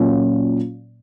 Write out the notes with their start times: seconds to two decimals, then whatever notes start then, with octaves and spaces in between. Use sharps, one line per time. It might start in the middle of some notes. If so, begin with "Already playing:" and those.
Already playing: A#2 F#3 A#3 C#4